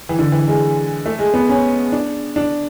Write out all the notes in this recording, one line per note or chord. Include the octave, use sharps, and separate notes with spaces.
E3
D3
E3
G#3
A3
G#3
B3
C#4
D4
D4